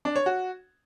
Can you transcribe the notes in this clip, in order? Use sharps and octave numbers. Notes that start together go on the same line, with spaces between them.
D4
C#5
F#4